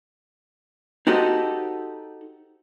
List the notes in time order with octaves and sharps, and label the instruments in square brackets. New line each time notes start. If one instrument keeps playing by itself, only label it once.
[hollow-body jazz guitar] D#4 F#4 G4 A4 C5 D#5